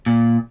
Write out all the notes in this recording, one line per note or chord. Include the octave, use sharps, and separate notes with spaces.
A#2